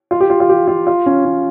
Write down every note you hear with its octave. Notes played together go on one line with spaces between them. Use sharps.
F4
G4
F4
F4
G4
F4
F4
C#4
C#4